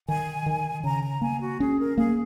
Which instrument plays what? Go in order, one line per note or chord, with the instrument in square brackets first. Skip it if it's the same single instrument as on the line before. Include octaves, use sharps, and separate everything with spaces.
[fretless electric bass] D#3 [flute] G#5
[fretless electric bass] D#3
[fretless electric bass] C#3 [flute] A#5
[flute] A#5
[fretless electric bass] A#3 [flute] G#5
[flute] F#4
[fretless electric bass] C#4 [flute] G#4
[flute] A#4
[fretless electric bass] A#3 [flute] G#4